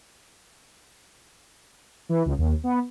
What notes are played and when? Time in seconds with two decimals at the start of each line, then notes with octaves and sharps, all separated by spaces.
2.09 E3
2.26 C#2
2.38 D#2
2.64 B3